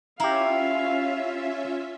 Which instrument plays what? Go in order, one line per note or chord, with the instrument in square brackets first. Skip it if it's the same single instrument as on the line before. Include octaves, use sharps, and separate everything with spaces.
[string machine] C#4 F4 E5 [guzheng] E4 [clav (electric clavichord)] G4 A#5 [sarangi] F5